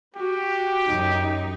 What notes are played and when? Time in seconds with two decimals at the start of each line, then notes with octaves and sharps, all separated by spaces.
0.16 F#4 G4
0.88 F#2 D#4